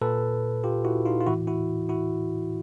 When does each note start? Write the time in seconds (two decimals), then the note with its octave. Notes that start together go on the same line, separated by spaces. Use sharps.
0.01 A#2 A4 B4
0.64 F4 G4
0.85 E4 F#4
1.05 D#4 F4
1.21 F4
1.27 A2 E3 E4 F#4
1.47 E4 F#4
1.89 E4 F#4